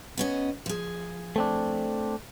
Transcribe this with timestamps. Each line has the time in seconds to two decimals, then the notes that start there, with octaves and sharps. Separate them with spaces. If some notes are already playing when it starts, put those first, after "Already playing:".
0.17 B3 C#4 D#5
0.66 F3 G#4
1.36 A3 C4 D4